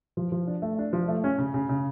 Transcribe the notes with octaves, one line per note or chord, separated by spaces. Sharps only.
F3
F3
D4
A3
D4
F3
A3
C#4
C#3
C#3
C#3